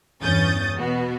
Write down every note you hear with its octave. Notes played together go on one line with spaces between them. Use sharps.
E2 G2 C#4 D#6 G6 A6
B2 B3 F#4